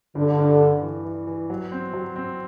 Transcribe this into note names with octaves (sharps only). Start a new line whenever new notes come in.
G2 D3
G2
G2
E3
E3
E3
F#3
C4
F#3
C4